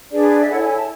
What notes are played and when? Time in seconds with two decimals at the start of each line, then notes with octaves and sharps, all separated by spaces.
0.12 D4 G#4 B4 D5
0.41 E5
0.49 E4 A4 C#5 F#5
0.61 G#5
0.73 A5